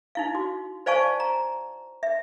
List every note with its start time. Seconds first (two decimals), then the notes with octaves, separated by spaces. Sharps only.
0.15 D#4 E4 F5
0.35 F#4
0.86 C5 D5 F5 G#5 A5 C#6
1.20 A#5
2.03 E5